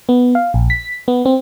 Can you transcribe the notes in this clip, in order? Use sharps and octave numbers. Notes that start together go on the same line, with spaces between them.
B3
F5
A#1
B6
B3
C4